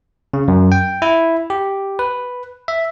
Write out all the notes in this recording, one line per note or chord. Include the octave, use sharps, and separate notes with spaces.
C#3
F#2
G5
E4
G4
B4
E5